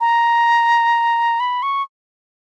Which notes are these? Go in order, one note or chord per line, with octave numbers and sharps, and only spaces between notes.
A#5
B5
C#6